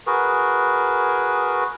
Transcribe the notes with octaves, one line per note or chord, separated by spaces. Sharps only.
F#4 G#4 A#4 B4